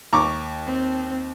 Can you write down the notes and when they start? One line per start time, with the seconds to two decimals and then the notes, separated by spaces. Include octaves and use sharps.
0.13 D#2 A#5 C#6 D6
0.66 C4